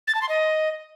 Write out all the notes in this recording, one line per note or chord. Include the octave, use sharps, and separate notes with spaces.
A6
A5
C6
D#5